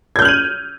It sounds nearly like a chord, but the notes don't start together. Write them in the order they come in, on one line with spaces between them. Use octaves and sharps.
G#6 G6 F6 F#7 D#7